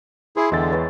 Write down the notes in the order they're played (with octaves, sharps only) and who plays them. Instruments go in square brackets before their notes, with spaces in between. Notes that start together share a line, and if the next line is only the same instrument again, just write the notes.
[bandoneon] E4 G#4 [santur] C5
[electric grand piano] E2 A6 [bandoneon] D3 [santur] G#3 E5 G5
[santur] B4 C#5